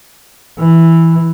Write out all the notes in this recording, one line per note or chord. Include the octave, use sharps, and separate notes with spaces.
E3